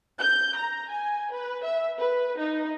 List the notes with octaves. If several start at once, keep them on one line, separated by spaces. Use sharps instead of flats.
G6
A#5
G#5
B4
E5
B4
D#4